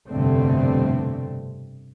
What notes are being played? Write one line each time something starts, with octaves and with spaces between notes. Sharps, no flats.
F1 G2 B2 D3 A3 C4